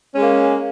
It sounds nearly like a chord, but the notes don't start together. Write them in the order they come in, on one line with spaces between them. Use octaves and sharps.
C#4 G#3 A#3